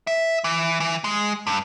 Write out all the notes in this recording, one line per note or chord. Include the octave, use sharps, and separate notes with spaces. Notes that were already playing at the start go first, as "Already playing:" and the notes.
E5
E3
E3
G#3
G2